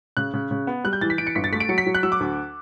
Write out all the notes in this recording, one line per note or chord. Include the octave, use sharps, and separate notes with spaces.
C#3 F#6
C#3
C#3
B3
G3 F#6
G6
E3 A6
B6
E3 D7
C#7
G1 B6
A6
A3 B6
D7
F#3 C#7
B6
F#3
F#6
F#3 E6
D6
D2